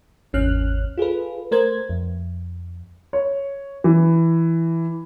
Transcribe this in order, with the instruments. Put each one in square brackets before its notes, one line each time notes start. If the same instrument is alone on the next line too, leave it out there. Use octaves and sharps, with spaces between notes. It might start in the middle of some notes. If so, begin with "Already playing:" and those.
[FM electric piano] G#1 E2 C#4 F6 F#6
F4 G#4 A4 B4
A3 A#4 C5 G#6
F2
[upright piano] C#5
E3